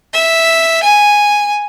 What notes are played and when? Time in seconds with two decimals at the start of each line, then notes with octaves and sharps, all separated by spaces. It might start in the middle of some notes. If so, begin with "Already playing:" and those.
0.14 E5
0.83 G#5